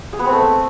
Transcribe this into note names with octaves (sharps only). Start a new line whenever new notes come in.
G#4
B3
C4
A3